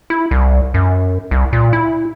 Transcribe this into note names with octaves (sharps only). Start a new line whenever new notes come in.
E4
C2
F#2
C2
A#2
E4